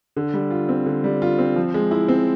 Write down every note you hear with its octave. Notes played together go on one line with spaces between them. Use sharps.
D3
G3
F4
C4
D3
G3
F4
C4
F3
G#3
E4
C4